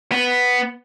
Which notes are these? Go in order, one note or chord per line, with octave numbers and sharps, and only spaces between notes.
B3